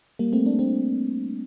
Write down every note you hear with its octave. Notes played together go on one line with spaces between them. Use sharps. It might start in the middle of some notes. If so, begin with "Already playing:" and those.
G3 A#3
A3 C4
A#3 D4
A3 C4